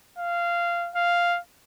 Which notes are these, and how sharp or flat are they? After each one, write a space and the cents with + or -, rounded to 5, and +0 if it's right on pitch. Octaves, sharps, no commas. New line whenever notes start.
F5 -15
F5 +0